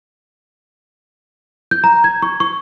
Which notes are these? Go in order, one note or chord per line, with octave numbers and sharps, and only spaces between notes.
G6
A#5
G#6
C#6
C#6